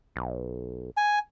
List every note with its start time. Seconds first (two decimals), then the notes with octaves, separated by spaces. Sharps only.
0.16 B1
0.97 G#5